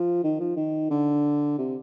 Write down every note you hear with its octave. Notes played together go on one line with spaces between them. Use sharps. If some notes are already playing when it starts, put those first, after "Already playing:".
Already playing: F3
D#3
F3
D#3
D3
C3